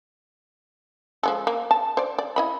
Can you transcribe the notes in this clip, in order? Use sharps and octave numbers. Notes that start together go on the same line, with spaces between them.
F3 G#3 A4
A#3
A5
C5 D5
D5
E4 D#5 B5